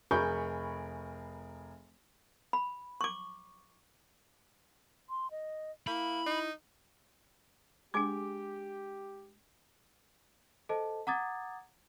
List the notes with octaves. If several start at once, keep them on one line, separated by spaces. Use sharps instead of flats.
F1 G#4 A#4 B5 C#6 G6
B5
C#6 D6
C6
D#5
A#3 E4 B5
D#4
G#3 D4 G4 G#4 G#5 D6
A4 C5 D#5 A5
F#5 A#5 D6 D#6 G#6 A6